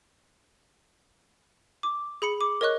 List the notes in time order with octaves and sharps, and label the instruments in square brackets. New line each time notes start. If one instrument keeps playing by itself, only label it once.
[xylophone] D6
G#4 B5 C#7
D6
A#4 C#5 D#5 C#6 F#6